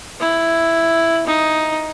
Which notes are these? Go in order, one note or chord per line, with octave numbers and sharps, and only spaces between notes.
E4
D#4